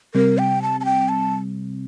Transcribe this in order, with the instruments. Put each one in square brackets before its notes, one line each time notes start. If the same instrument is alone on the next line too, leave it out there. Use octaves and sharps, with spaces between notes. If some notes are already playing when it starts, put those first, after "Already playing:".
[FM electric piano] C3 G3 C4 [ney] A#4
[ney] G5
A5
A5
G5
A5